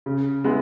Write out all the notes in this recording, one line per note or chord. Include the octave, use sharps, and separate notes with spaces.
C#3
G#3 B3 E4